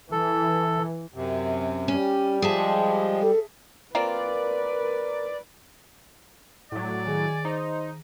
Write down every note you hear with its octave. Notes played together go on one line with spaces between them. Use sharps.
E3 A4
F#2 C3
G3 C#4
F3 G#3 G#4 E5 A5
A4
A#3 C4 F4 A#4 B4 D5
A2 F#3 D5
D#3 G#4 G#5
D#4 C5